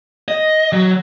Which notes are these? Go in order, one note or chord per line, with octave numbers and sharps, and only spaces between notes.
D#5
F#3